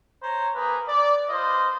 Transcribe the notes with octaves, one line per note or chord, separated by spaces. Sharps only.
C5 C#5 A#5
A#3 G#4 A#4 B4
D5
F4 B4 C5 D#5